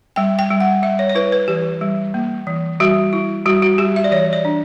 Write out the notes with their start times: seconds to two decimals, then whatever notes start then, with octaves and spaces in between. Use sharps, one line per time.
0.16 G3 G5
0.39 G5
0.50 G3
0.60 F#5
0.83 G3 E5
0.99 C#5
1.09 C#5
1.15 E4 B4
1.32 B4
1.48 E3 G4
1.81 G3
2.14 A#3
2.47 E3
2.80 G3 F#4
3.13 E4
3.46 G3 F#4
3.62 F#4
3.78 G3 G4
3.96 E5
4.04 D5
4.11 E3 C#5
4.33 D5
4.45 D4